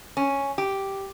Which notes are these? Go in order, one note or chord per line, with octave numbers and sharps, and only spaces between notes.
C#4
G4